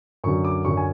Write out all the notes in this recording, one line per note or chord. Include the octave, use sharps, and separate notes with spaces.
F#2 D3 F#3 C#6
D6
F#2 D3 F#3 C#6
G#5